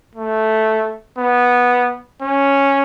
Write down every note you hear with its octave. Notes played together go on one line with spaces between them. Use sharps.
A3
B3
C#4